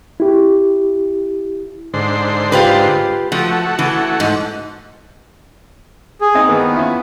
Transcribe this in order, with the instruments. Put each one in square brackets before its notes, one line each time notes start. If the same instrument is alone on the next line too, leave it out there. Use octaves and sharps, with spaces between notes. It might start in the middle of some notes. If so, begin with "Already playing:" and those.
[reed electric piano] E4 G4
[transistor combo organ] G#2 D3 C5
[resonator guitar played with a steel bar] F4 G4 B4
[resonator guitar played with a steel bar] F3 [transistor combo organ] A3 F#4
[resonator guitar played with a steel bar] E3
G#2
[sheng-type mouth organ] G#4
[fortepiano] C4 D#4
[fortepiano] D#3 E3 A#3 [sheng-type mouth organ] B3
[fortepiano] C#4 E4 F4